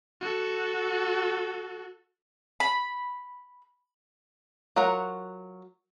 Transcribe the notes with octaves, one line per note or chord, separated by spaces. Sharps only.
F#4 A4
B5
F#3 F4 A#4 F#5